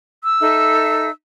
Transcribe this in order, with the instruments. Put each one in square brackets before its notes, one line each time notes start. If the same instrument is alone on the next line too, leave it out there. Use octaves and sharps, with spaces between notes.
[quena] E6
[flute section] D#4 A4 E5